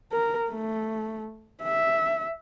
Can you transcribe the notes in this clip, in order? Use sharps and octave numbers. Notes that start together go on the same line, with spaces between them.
A#4
A3
E5